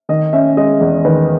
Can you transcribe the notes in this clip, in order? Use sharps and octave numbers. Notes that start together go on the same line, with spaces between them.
D#3 D#5
C#4 E5
G#3 D#5
E2
D#3 B4